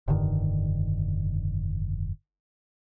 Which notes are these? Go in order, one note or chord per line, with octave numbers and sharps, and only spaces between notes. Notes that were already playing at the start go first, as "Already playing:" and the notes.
F1 G2 D3 D#3